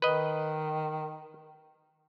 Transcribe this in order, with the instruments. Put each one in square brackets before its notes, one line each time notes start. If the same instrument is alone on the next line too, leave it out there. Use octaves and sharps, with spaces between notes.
[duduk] D#3 [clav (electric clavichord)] B4 D#5